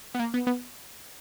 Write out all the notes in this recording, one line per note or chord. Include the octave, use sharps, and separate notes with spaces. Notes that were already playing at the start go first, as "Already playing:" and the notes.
B3
A#3
B3
B3